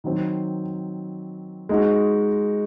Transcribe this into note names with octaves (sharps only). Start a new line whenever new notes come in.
D#3 F#3 C4
G#3 D#4 F#4